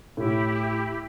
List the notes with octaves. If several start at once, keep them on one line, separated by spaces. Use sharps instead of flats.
A2 E4 G4